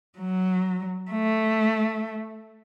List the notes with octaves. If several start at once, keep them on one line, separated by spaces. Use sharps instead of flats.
F#3
A3